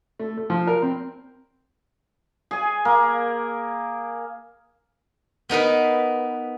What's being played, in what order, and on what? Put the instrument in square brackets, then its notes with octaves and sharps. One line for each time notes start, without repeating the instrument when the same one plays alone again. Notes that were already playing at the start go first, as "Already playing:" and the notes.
[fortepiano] A3
A3
F3
A#4
C4
[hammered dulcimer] G#4 G#5
A#3
[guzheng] B3 D#4 A#4 B4